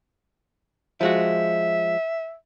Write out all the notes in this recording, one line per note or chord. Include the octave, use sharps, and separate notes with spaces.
F3 G#3 F#4 E5